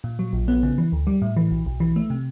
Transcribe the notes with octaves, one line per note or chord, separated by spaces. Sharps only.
A#2
F#3
A#1
B3
C#3
E3
D2
G3
A2
E3
B1
B1
E3
A3
C3